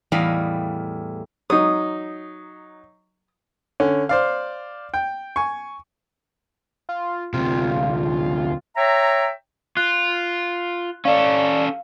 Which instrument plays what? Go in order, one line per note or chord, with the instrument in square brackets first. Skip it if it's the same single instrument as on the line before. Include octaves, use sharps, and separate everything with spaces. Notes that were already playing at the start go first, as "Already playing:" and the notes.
[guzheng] E2 A2 G3 D#5 F5 B5
[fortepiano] F#3 D#4 [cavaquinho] D#6
[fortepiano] D3 C#4
C5 D5 F5
G5
G#5 C#6
[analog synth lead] F4
[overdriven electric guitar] D2 C3 [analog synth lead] F4
[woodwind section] C#5 E5 G5 A#5
[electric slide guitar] F4 [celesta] F#6
[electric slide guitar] C#4 A4 [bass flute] D5 [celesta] F5